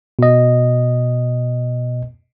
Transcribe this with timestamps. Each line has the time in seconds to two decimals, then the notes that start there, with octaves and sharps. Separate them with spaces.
0.19 B2 D#5